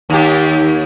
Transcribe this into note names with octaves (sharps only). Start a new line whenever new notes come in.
D#2 G4